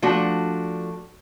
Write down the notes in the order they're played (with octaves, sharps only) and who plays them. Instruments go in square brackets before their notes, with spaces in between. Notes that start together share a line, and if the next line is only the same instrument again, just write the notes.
[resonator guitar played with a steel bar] F3 A3 D4 F#4